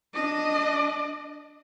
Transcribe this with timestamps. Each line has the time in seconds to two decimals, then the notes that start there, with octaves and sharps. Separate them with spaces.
0.14 D4 D#5